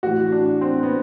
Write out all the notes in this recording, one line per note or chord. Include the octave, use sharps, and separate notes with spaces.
A2 E3 F#4
D4
C4
B3